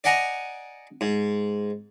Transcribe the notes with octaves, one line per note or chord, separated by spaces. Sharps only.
D5 D#5 F#5 G#5 A#5
G#2